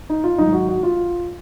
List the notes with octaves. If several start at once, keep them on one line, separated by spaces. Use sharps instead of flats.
D#4
F4
G#2 D#3 F#3 D#4
F#4
F#4
F4